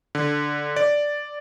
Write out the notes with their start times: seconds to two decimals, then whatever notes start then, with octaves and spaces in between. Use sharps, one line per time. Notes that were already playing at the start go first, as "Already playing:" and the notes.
0.15 D3
0.76 D5